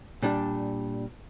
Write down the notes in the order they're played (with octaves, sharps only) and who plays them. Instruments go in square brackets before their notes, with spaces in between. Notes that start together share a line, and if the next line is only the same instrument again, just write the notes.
[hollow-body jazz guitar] A#2 G3 D4